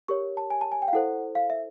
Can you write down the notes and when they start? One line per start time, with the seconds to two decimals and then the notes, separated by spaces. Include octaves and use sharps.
0.08 G4 A#4 C#5 C#6
0.37 A5
0.50 G#5
0.61 A5
0.72 G#5
0.82 G5
0.88 F5
0.93 E4 A4 C5 F#5
1.35 F5
1.50 E5